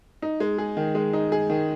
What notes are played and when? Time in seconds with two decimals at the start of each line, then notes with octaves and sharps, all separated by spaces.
0.22 D#4
0.40 G#3
0.58 G#4
0.77 D#3
0.95 G#3
1.13 D#4
1.32 G#4
1.50 D#3